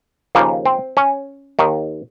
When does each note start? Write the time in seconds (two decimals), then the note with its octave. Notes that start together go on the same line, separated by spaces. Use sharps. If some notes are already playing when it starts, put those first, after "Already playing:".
0.35 D#2 C#3 F3 A#3
0.66 C4
0.97 C#4
1.59 D#2 D#3